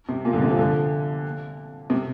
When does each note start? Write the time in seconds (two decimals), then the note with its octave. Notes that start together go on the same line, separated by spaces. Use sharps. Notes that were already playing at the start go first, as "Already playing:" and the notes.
0.09 C3
0.25 A#2
0.33 D3
0.42 C3
0.50 F3
0.58 D3
1.90 C3